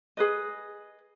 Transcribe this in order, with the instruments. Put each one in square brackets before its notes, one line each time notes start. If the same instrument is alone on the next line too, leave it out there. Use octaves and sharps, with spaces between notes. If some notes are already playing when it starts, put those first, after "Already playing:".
[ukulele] G#4 B4 D#5